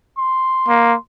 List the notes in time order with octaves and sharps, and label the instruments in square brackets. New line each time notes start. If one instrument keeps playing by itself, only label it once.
[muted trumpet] C6
[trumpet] A#3